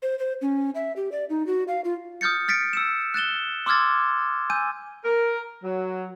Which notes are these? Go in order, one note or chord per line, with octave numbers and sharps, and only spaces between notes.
C5
C5
C#4
E5
G4
D5
D#4
F#4
F5
F4
D#6 F6 G6 A6 C#7
F6 A6 B6 C#7 D7
E6 C#7 E7
F#6 A6 E7 G7
C6 D6 E6 F6 G#6 A6
G#5 E6 G6 D#7
A#4
F#3